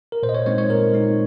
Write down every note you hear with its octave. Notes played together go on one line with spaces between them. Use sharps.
A#4
A#2 C5
D#5
C#5
G#3 C4 D#4 C#5
C#5
A#2 A#4
G#3 C4 D#4